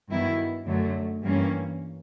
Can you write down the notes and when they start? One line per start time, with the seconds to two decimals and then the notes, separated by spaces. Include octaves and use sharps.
0.09 G2 D#3 F#3 B3 E4
0.66 F#2 D3 F#3 A3
1.22 G2 E3 G3 A#3 C#4